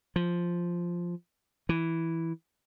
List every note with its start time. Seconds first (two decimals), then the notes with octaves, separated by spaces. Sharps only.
0.16 F3
1.69 E3